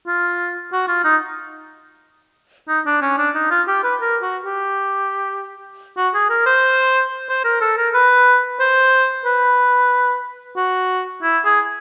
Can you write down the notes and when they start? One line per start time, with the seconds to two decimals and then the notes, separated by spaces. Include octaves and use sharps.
0.07 F4
0.73 F#4
0.88 F4
1.05 D#4
2.69 D#4
2.86 D4
3.02 C#4
3.18 D4
3.35 D#4
3.51 F4
3.68 G4
3.84 B4
4.01 A#4
4.22 F#4
4.45 G4
5.97 F#4
6.15 G#4
6.30 A#4
6.46 C5
7.29 C5
7.45 A#4
7.61 A4
7.77 A#4
7.94 B4
8.60 C5
9.25 B4
10.57 F#4
11.23 E4
11.45 G#4